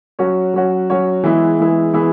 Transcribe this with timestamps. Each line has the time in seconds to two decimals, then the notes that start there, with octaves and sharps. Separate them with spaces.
0.19 F#3 C#4 F#4 C#5
0.54 F#3 C#4 F#4 C#5
0.90 F#3 C#4 F#4 C#5
1.24 E3 G#3 B3 E4 G#4
1.59 E3 G#3 B3 E4 G#4
1.94 E3 G#3 B3 E4 G#4